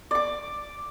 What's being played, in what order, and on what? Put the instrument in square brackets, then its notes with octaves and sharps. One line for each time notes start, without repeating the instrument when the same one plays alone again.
[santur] D5 D6